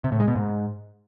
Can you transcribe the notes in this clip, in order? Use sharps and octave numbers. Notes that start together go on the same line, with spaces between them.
C3
A2
G#3
B2
G#2